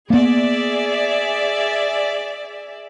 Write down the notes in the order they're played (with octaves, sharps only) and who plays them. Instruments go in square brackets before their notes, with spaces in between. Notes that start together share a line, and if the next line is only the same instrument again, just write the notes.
[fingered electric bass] A#3 B3 [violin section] G#4 D5 E5